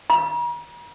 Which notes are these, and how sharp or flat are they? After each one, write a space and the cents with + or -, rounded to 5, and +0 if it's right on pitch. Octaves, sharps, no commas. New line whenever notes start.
A#5 +45